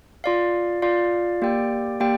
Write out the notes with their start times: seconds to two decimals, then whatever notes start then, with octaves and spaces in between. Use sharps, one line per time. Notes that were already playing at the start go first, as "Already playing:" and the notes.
0.24 F4 D5 F5
0.82 F4 D5 F5
1.42 A#3 G4 D5 G5
2.00 A#3 G4 D5 G5